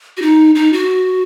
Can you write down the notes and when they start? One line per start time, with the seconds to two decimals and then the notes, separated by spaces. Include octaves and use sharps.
0.17 F#4
0.22 D#4
0.55 D#4
0.73 F#4